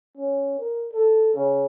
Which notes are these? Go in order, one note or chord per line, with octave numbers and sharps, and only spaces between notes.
C#4
A#4
A4
C#3